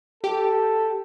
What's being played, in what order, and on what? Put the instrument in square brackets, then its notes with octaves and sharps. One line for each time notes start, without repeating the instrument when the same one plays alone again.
[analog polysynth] G4 [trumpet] A4